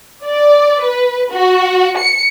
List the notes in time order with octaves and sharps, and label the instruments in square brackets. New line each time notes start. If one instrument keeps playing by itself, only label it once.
[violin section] D5
B4
F#4
C#7